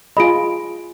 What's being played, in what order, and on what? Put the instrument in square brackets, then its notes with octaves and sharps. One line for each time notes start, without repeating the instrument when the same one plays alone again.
[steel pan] F4 G#4 D#5 [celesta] B5 D7